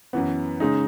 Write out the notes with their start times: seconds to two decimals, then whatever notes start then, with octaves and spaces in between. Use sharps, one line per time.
0.13 F#2 E3 B3
0.60 C#3 G#3 D#4